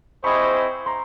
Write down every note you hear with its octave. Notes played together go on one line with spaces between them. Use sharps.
C4 E4 G#4 C5 D#5 B5 C#6
A#5 C6